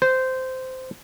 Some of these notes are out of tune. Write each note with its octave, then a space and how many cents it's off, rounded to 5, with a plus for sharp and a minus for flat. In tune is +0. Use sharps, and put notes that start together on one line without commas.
C5 -15